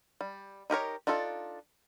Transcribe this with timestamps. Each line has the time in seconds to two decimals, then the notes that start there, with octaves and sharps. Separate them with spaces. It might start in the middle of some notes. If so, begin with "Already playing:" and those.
0.21 G3
0.70 D#4 G4 A#4 C#5
1.07 D4 D#4 F4 A4